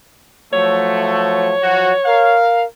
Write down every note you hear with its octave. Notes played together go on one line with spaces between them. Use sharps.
F3 F#3 A3 C#5
F3 F#3 F#4
A#4 F5